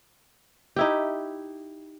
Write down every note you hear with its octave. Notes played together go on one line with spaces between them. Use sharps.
D#4 E4 G4